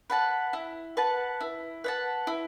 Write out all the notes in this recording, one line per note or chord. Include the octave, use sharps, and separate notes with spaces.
B4 F#5 A5
E4
B4 F#5 A5
E4
B4 F#5 A5
E4